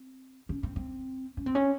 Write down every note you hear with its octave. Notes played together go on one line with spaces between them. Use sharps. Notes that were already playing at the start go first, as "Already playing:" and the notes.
Already playing: C4
C#4
C4
C4
C#4
C4
C#4